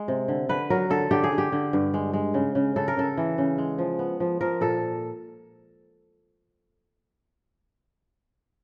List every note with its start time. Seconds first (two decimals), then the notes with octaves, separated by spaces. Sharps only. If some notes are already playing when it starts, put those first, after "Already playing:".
Already playing: G#3
0.08 C3
0.28 D3
0.49 D3 B4
0.70 F#3 A#4
0.90 D3 A4
1.11 D3 G4
1.24 G#4
1.32 D3
1.38 G4
1.52 D3
1.73 G2
1.94 G#3
2.13 G#3
2.34 C#3
2.55 C#3
2.76 C#3 A4
2.88 A#4
2.97 C#3 A4
3.17 E3
3.38 C#3
3.58 G#3
3.78 F3
3.99 B3
4.20 F3
4.41 F3 A#4
4.61 A#2 A4